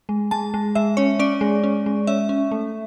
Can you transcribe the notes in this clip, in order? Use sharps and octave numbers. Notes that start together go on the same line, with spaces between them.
G#3
G#3 A5
G#3
G#3 E5
C#4 C#5
C#4 D5
G#3
C#4
G#3
C#4 E5
C#4
A3